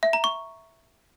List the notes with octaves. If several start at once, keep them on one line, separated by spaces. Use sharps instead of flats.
E5
A#5
C#6